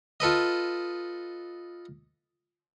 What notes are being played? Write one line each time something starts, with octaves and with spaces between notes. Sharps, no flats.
F4 A4 B4 D#5